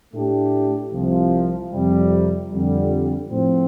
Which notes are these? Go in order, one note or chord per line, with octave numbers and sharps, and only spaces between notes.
A2 A3 D4 G4
C2 C3 F3
F2 C3 G3
F2 D3 G3
A2 F3 C4